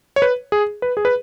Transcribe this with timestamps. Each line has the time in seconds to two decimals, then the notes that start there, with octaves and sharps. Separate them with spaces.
0.16 C#5
0.22 B4
0.52 G#4
0.82 B4
0.97 G#4
1.05 B4